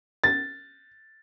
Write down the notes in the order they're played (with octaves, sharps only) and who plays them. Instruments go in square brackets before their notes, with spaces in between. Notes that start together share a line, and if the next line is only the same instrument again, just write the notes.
[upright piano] A6